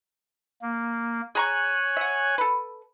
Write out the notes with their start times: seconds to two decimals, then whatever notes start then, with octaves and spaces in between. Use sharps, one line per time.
0.62 A#3
1.35 G#4 C#5 G#5 A#5 C#6 F#6
1.97 E5 F#5
2.38 A4 B4